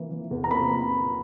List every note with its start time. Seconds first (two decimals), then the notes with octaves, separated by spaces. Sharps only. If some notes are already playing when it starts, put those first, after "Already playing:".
Already playing: E3 A#3
0.11 E3
0.31 E2
0.44 A#5
0.51 A#3 B5